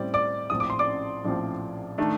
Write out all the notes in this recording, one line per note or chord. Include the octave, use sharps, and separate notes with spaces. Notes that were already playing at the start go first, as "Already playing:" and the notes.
Already playing: A2 G3 C4 D5
D5 D6
A#1 A2 F3 C4 D#6
D6
C6
D5 D6
A#1 A2 F3 C4
D#3 A3 D4